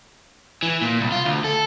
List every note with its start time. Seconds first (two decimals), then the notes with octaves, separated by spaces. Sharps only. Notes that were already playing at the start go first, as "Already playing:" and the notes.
0.63 E3
0.82 A#2
1.01 C2
1.12 F4
1.25 D2
1.44 A4